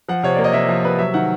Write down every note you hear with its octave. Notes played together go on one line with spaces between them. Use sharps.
F3 F#5
C3 C#5
A#3 D5
D#5
C3 E5
F3
C3 B4
F#3 E5
D#3 F#5